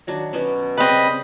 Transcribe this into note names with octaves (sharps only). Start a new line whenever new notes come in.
D#3 F#3 D4
B2 B3 C#4
C#3 G3 C4 B4 D#5 B5